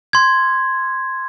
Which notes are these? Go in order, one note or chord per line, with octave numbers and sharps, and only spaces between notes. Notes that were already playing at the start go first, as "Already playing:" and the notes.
C6 G#6